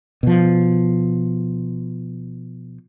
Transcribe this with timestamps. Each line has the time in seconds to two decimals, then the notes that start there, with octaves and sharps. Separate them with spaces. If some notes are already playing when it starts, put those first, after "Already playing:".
0.23 B2 F3